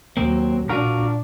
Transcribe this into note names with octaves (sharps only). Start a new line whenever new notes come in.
D#2 F#3 A#3 C4
A#2 D4 F4 F#4 A#4